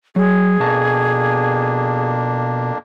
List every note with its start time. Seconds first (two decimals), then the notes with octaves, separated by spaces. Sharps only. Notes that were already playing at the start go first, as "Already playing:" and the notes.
0.16 F#3 G#4
0.60 F2 B2 A#3 D4 A5